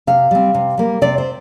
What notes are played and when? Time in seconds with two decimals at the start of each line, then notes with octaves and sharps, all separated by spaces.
0.07 C3 F5
0.31 G3 C4
0.54 C3
0.77 G3 A#3
1.02 C3 D5
1.18 C5